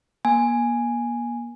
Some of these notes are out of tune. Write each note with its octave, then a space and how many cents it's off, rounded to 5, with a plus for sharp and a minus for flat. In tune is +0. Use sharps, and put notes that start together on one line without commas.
A#3 +40 G#5 +0